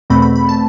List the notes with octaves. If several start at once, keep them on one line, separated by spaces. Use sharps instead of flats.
E2 B2 A3 C4 B5
B5
B5
A5